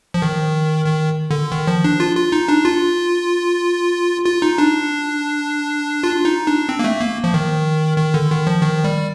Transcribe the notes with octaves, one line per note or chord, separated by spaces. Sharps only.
F3
D#3
D#3
D3
D#3
F3
D4
F4
F4
D#4
D4
F4
F4
D#4
D4
F4
D#4
D4
C4
A#3
A3
A#3
F3
D#3
D#3
D3
D#3
F3
D#3
G3